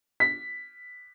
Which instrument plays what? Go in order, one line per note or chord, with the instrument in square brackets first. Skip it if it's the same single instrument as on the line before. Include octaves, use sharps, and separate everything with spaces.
[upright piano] B6